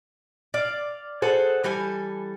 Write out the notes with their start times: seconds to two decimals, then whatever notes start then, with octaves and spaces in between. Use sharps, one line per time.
0.54 D5 F5
1.22 G#4 A4 C5 F#5
1.64 E3 G3 A4 G#5